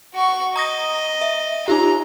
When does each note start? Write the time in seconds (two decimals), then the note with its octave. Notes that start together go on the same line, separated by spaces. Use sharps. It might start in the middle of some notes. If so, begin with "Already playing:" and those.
0.14 F#4 C#6
0.56 D#5 A#5 D#6 A#6
1.21 E5
1.68 D#4 F4 G4 A#5